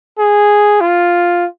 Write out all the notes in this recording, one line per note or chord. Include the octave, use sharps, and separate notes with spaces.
G#4
F4